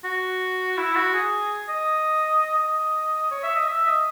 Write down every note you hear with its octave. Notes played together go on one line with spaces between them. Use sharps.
F#4
E4
F#4
G#4
D#5
D#5
C#5
E5
D#5
E5
D#5